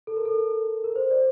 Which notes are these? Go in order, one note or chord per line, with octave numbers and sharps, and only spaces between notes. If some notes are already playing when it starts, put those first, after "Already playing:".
A4
A#4
A4
A#4
C5
D5